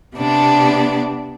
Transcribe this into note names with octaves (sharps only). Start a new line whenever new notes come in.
C3 B3 D4 D5